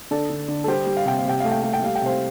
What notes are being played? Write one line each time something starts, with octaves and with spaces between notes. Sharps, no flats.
D3 A4 D5
D3
D3
A4
G3 G4 C5
G3
F5
C3 G5
F5
C3 G5
A3 F5
G5
A3 F5
G5
G3 F5
G5
C3 C5 F5